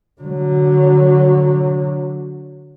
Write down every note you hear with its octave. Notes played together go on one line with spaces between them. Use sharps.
D3 F#3